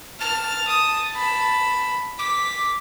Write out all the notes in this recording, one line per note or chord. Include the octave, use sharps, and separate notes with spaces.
A5 F6
D#6
B5
D6 B6